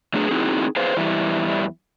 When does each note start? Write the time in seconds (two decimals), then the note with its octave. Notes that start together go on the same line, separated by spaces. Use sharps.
0.14 F#3 A3 D4 G#4
0.31 C4 D#4 E4 F#4 G#4
0.76 G#4 B4 C5 F5
0.97 E2 E3 G3 E4